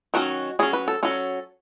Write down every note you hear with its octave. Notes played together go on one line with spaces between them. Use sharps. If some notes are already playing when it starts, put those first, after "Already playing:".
D#3 F#3 C#4 F#4
F#3 C#4 G#4
B4
A4
F#3 C#4 A4